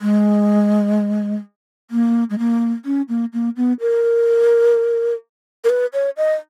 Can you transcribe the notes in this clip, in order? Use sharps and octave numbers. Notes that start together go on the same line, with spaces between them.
G#3
A#3
G#3
A#3
C#4
A#3
A#3
B3
A#4
A#4
B4
C#5
D#5